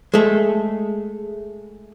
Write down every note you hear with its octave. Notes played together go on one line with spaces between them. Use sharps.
G#3 A3